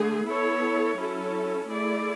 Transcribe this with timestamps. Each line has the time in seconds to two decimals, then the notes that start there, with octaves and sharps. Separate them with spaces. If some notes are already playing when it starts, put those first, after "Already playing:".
Already playing: D3 A3 G#4
0.26 B3 E4 A4 C#5
0.97 F#3 C#4 E4 A4
1.68 A3 E4 G#4 D5